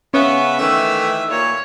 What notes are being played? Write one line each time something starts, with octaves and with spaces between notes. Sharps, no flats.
C#3 B3 C#4 E5
D#3 E3 A3 E6
A#2 C#5